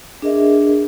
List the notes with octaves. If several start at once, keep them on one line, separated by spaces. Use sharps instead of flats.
D4 G#4 A#4 D#5 E5